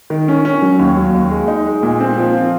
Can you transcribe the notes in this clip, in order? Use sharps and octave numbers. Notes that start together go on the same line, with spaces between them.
D#3
C#4
C#4
F#3
D#2
F#3
D#2
G#3
D#4
G#3
A#2
C4
F3
F4